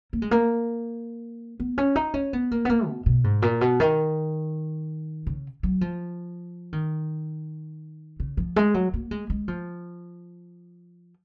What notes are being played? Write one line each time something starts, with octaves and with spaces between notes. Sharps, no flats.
A#3
G#3
A#3
B3
C#4
D#4
C#4
B3
A#3
B3
A#3
B2
B2
G#2
A#2
B2
D#3
C#3
F#3
F3
D#3
C#3
F3
G#3
F#3
A#3
G#3
G#3
F3